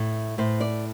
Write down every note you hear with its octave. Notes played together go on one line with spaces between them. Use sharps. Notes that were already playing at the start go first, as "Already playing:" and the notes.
Already playing: A2 A3
A2 C5
D5